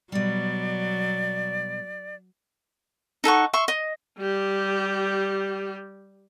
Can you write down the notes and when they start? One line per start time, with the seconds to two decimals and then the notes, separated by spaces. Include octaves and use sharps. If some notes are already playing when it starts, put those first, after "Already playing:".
0.12 B2 F#3 G3 D5
3.24 D#4 A4 F#5 C#6
3.53 E5 C6 C#6
3.68 D#5
4.18 G3 G4